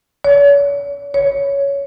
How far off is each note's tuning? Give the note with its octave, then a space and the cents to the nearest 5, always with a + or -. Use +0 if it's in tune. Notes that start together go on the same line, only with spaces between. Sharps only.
C#5 +40
C#5 +10